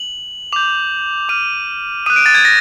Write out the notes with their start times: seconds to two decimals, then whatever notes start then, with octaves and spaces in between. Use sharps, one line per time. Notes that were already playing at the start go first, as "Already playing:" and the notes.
Already playing: F#7
0.52 D6 G6 F7
1.29 D6 F6 D#7
2.06 D#6 F#6 D#7
2.16 D7
2.26 A6
2.35 G#6
2.45 A#6